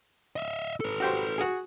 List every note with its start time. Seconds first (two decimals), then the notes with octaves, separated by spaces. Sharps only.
0.36 D#5 E5
0.80 A4 B4
1.00 F#4 G4 C5
1.38 F#4 G#4